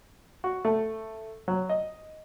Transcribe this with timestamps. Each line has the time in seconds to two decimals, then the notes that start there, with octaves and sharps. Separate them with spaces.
0.44 F#4
0.65 A3
1.48 F#3
1.69 D#5